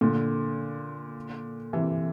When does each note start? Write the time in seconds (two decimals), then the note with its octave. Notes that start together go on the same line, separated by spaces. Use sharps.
0.01 A#2 D3
1.73 C3 E3